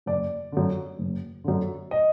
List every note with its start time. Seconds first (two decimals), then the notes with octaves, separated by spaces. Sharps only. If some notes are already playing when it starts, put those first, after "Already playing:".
0.06 F#1 D5
0.52 F#2 D3
0.99 F#1
1.44 F#2 D3
1.91 D#5